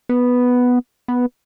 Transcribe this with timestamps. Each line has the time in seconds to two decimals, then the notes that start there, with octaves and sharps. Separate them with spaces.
0.09 B3
1.08 B3